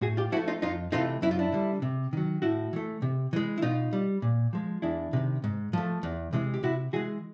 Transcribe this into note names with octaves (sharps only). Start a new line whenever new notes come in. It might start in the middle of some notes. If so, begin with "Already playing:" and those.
A2 F#4 G#4
F4 G4
F3 A3 E4 F#4
D#4 F4
F2 D#4 F4
C3 E3 A3 D#4 F4
F#2 E4
F4
D4 E4
D3 G3
C3
D#3 F#3
A2 E4 F#4
E3 A3
C3
E3 G#3
E4
B2 D#4 F4
G3
A#2
F3 G#3
E2 D4 E4
C3 D#3
G#2
F3 A3
E2
C3 E3 G#3
G4
C3 E4 F#4
E3 G#3 F#4 G#4